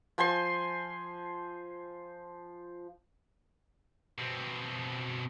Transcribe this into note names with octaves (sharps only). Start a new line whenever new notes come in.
F3 C5 G#5 C6
B2 C4